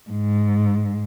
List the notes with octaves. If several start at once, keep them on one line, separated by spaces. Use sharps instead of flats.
G#2